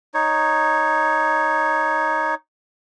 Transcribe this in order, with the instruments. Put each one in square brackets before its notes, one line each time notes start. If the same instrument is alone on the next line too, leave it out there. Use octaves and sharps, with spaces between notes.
[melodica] D#4 C#5